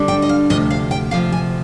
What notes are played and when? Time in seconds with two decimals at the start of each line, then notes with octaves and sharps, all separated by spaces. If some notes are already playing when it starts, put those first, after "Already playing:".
Already playing: D3 G3 D4
0.08 G5
0.22 D#5
0.29 F5
0.50 D2 C3 F3 D#5
0.71 F5
0.91 G5
1.11 D2 C3 F3 F5
1.32 G#5